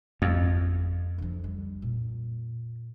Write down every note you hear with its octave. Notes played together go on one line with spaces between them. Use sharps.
G#1 F2
D3 F3
G3
A#2